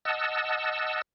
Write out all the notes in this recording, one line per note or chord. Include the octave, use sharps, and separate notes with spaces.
D#5 F#5 A5 E6